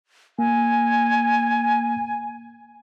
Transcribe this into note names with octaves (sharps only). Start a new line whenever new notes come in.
A#3 G#5